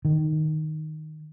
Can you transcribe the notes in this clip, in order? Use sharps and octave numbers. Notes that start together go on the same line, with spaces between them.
D#3